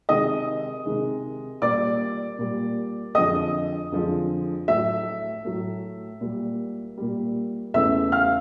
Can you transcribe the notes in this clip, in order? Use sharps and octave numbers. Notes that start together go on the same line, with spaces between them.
C3 D#3 G#3 D#5 D#6
C3 D#3 G#3
A#2 G3 D5 D6
A#2 G3
F2 D3 F3 G#3 D#5 D#6
F2 D3 F3 G#3
A2 F#3 A3 E5 E6
A2 F#3 A3
A#2 G3
A#2 G3
E2 C#3 E3 A3 E5 E6
F5 F6